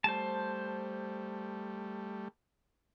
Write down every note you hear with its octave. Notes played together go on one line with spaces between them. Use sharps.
G3 A3 C5 A5